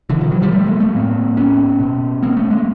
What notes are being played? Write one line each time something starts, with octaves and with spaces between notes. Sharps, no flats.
B2 D3 E3
D#3 F3
E3 F#3
F3 G3
G3 A3
G#3 A#3
A3 B3
A2 A#3 C4
B3 C#4
B2
A#3 C4
A3 B3
G#3 A#3